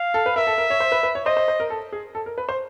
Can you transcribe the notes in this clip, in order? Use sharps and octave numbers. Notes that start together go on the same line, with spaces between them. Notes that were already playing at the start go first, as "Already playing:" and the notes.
Already playing: F5
A4
B4
A#4 E5
A4
A#4
C#5
C5
B4
B4
C#5
C5 D#5
C5
C5
A#4
A4
G#4
A4
A#4
B4
C5